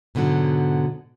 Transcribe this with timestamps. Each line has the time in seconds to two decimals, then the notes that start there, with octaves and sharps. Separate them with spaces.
0.15 G#2 B2 D3 E3 F#3